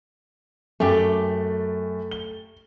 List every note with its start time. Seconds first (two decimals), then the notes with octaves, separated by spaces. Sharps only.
0.80 F#2 A3 G4
2.11 G7